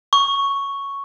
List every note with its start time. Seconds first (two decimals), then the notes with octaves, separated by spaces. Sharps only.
0.13 C#6